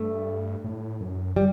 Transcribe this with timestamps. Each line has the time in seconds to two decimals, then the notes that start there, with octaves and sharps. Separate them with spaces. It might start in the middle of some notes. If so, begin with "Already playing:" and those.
Already playing: G2 A3
0.64 A2
1.01 F#2
1.36 G3